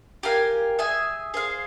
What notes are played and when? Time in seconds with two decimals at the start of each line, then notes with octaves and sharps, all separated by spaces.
0.23 G4 A#4 F5 G#5
0.79 G#4 E5 G#5
1.34 G#4 C5 F5